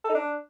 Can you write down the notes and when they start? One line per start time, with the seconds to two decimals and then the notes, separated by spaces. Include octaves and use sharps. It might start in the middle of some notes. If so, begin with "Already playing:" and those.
0.04 A4
0.09 D#4
0.15 D4